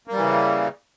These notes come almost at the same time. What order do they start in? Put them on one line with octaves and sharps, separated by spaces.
A#3 G3 E3 C#3